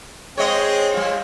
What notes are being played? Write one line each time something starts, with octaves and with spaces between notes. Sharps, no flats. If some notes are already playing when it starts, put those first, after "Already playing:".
G#3 C4 C#5 D#5
G3 F4